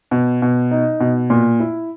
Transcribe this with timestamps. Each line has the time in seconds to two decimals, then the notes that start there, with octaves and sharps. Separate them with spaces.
0.11 B2
0.42 B2
0.71 D#4
1.00 B2
1.30 A#2
1.60 E4